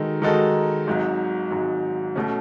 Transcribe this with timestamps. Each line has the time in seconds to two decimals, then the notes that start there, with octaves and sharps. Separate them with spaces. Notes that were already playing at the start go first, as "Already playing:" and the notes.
Already playing: D#3 G#3 D#4 F#4 A4
0.22 D#3 G#3 D#4 F#4 A4
0.87 G#1 G#2 F#3
1.51 G#1 G#2 F#3
2.15 B2 A3 C#4